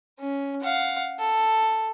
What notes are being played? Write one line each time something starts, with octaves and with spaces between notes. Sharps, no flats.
C#4
F5 F#5
A4